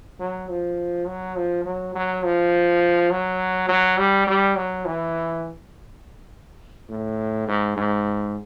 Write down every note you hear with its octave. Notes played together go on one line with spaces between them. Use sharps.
F#3
F3
F#3
F3
F#3
F#3
F3
F#3
F#3
G3
G3
F#3
E3
A2
G#2
G#2